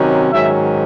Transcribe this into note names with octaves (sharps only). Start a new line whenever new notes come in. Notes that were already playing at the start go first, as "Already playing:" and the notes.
Already playing: C3 D#3 F#3 C#4
G#2 D#3 F#3 C#4 E5